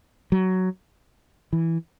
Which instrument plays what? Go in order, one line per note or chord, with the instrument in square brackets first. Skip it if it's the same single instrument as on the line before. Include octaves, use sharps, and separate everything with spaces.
[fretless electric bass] F#3
E3